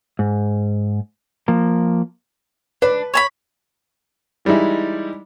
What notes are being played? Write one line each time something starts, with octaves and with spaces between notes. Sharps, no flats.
G#2
F3 A#3
D4 B4
C#5 A5 B5
E3 G3 G#3 D#4 E4